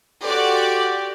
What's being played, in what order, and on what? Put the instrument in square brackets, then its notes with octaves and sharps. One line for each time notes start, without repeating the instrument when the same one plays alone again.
[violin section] F#4 D5 [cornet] G4 [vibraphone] A4 G5 C6